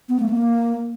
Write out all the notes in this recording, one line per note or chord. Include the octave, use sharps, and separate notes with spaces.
B3
A3
A#3